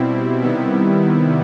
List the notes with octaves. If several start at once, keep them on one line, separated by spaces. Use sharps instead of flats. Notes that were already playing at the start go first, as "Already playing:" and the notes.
Already playing: B2 G3 C4 E4
C3 D#3 G3 B3 E4